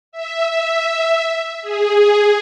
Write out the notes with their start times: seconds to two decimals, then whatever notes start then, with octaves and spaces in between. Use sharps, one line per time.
0.12 E5
0.49 E5
1.61 G#4